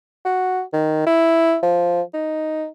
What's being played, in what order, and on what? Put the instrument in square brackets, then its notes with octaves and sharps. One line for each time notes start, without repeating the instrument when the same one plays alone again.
[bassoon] F#4
D#3
E4
F3
D#4